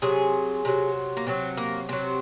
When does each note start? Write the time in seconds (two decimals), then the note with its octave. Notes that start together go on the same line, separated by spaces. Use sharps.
0.02 C3 F#3 G#4
0.65 C3 F#3
1.17 A#3
1.27 C3 F#3 C4
1.57 A#3
1.89 C3 F#3 C4